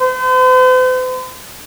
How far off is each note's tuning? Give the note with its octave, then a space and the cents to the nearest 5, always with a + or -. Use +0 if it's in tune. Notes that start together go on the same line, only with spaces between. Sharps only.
C5 -45